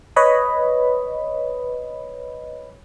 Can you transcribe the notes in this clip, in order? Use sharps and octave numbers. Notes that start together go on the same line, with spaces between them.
B4 C#5 D#5 B5